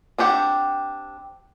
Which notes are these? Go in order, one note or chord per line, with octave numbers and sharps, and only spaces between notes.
C4 D4 G4 F#5